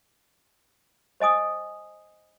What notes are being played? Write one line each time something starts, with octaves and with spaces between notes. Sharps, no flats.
C5 D#5 G#5 D#6